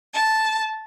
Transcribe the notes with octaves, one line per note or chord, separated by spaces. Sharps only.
A5